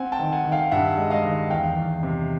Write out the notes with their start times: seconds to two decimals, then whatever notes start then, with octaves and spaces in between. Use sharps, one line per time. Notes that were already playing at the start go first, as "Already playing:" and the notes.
Already playing: C4 F#5 G#5
0.12 G5 A5
0.19 D#3
0.32 F#5 G#5
0.45 D#3
0.52 F5 G5
0.71 G2 E5 F#5
0.97 G#3
1.10 D#5 F5
1.24 D#3
1.50 E2 F5 G5
1.76 E2
2.03 C3